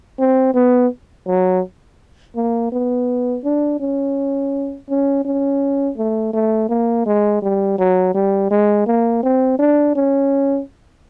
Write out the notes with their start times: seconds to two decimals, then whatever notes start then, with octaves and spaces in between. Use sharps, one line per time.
0.19 C4
0.54 B3
1.27 F#3
2.36 A#3
2.72 B3
3.44 D4
3.80 C#4
4.89 C#4
5.25 C#4
5.97 A3
6.33 A3
6.69 A#3
7.06 G#3
7.42 G3
7.78 F#3
8.14 G3
8.50 G#3
8.87 A#3
9.23 C4
9.59 D4
9.95 C#4